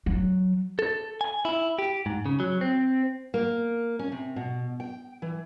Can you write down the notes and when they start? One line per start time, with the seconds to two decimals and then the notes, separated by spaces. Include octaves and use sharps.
0.06 F#3
0.79 A4
1.21 G#5
1.45 E4
1.79 G4
2.06 G#2
2.26 C#3
2.40 F#3
2.61 C4
3.34 A#3
3.99 C#4
4.12 C3
4.36 B2
4.80 G5
5.22 E3